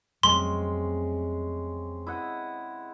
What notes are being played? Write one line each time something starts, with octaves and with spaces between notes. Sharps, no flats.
F2 C3 F#3 G#3 A3 C#4 C6
E4 D#5 F#5